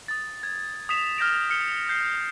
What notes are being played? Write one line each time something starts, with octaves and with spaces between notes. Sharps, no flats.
D#6 A6
G#6
D#6 G#6 B6 E7 F7
F6 G6 A#6 D7
F6 C#7 G7
G6 C7